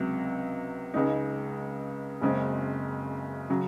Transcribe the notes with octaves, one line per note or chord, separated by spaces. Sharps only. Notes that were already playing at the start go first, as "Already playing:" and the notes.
Already playing: C#2 C3 F#3
C#2 C#3 G#3 D#4
F#1 F#2 C#3 G#3 C4
C#3 F#3